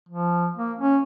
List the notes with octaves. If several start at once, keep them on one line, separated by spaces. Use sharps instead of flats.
F3
A#3
C#4